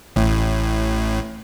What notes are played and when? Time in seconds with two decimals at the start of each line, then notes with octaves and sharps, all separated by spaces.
0.16 A1 A2